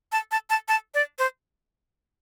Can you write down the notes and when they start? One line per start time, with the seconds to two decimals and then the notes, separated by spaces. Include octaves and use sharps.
0.12 A5
0.31 A5
0.50 A5
0.68 A5
0.94 D5
1.19 C5